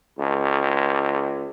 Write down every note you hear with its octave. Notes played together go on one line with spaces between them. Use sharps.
C#2